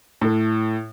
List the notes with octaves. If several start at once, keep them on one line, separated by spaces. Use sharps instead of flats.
A2 A4